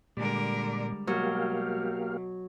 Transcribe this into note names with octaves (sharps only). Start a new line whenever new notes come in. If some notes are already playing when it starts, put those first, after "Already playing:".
A#2 D3 G3 G#3 A#4 D5
B2 F#3 A#3 G4 F5